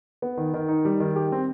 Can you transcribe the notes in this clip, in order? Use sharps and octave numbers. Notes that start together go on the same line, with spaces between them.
B3
D#3
D#3
D#4
G3
D#3
G4
C4